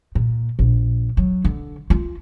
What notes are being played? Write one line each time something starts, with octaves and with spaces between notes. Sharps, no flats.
A#2
A#1
F#3
D3
F4